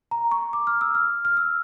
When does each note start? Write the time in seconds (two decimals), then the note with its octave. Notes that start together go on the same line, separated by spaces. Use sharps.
0.11 A#5
0.31 C#6
0.53 D6
0.67 F6
0.81 E6
0.95 F6
1.25 F6
1.37 E6